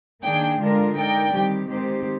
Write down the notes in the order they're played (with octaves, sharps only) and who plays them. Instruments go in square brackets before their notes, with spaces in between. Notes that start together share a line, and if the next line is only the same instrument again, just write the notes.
[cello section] D#3 A#3 D4 G#4 [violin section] G5
[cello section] D3 G#3 D4 F4 A#4
[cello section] G#3 D#4 A#4 D5 [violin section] G5
[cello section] D#3 G3 C4 G4
D#3 G#3 C4 G4 C5